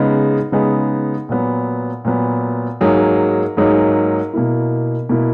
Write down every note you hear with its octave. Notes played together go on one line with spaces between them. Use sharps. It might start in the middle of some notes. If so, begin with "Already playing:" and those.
Already playing: C#3 G#3 B3 D#4 G#4
C#3 G#3 B3 D#4 G#4
A#2 F#3 B3
A#2 F#3 B3
G#2 F#3 A#3 D#4 G#4
G#2 F#3 A#3 D#4 G#4
B2 A#3 E4
B2 A#3 E4